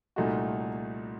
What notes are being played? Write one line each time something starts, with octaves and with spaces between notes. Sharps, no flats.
C2 A#2 A3 D#4 F#4